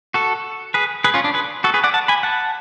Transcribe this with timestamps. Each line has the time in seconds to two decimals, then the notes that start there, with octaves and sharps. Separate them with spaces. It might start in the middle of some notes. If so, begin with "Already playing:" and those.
0.14 F#4 A4
0.74 G#4 B4
1.04 G#4 B4
1.14 C#4 F4
1.24 D4
1.34 G#4 B4
1.64 F#4 A4
1.74 G#4 B4
1.84 D5 F#5
1.94 F#5 A5
2.08 G#5 B5
2.23 F#5 A5